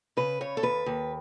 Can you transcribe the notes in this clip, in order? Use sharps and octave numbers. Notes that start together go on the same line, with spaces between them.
C#3 B4
C#3 C#5
A4
D#2 B4
D#2